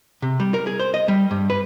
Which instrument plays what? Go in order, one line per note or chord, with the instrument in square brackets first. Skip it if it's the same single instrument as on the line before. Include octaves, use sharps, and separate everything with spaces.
[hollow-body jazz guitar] C3
G3
A#4
G#4
C5
D#5
G3
G2
B4